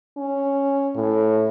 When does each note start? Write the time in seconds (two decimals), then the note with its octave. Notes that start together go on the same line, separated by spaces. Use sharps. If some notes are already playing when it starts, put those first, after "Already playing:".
0.17 C#4
0.95 A2